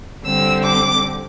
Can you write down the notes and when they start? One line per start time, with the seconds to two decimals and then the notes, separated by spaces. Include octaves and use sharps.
0.24 D3 G3 C4 E6
0.64 D6